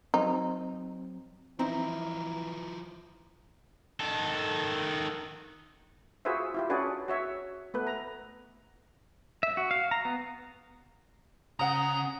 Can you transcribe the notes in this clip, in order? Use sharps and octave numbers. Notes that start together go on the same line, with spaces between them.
F#3 C4 D#4
E3 F3 C4 D#4 E4 A#5
D#3 A4
F4 F#4 G#4 B4 C5 E5
E4 F4 G4
C#4 D4 F#4 G#4 B4 D5
F#4 C#5 E5
A3 B3 B4
A#5
E5
F#4
F5
A#5
B3
C#3 F#5 A#5 D#6